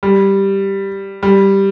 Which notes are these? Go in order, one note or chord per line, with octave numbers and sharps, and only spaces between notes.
G3
G3